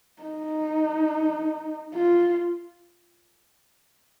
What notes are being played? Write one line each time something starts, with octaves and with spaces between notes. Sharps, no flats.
D#4
F4